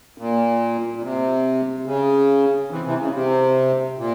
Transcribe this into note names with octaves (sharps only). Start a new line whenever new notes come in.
A#2
A#2
C3
C#3
C3 E3
C3 E3
C#3
C3
A#2